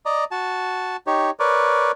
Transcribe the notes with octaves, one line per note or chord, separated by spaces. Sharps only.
D5 D#5 A#5
F#4 A5
D#4 G4 C#5
A#4 B4 C#5 D5